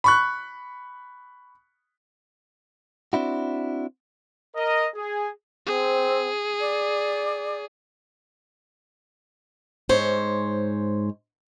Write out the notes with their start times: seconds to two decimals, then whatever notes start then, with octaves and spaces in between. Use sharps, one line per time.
0.04 B5 C#6 F#6
3.13 C4 D4 E4 F#4
4.56 A#4 D#5
4.96 G#4
5.66 C4 G#4
6.60 D5
9.89 G#2 C5 C#5